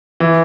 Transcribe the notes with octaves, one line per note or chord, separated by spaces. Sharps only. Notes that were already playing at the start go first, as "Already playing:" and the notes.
E3